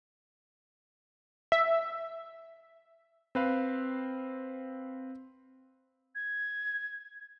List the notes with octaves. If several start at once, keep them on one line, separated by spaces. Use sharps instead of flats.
E5
C4 B4 F5
G#6